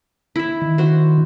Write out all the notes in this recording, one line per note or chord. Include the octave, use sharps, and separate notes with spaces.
E4 E5
D#3
F#4 C5